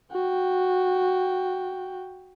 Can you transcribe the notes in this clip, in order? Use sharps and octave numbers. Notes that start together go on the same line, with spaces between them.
F#4 G5